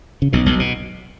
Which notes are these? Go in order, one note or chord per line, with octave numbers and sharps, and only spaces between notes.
C#3
B1 B2
B1 B2
B2